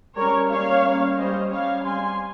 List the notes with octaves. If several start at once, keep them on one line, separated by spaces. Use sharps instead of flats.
G3 C#4 A#4 C#5
G3 A#3 C#4 C#5 F5
G3 A#3 C#4
G3 C#4 C5 D#5
G3 C#4 C#5 F5
G3 C4 G#5 C6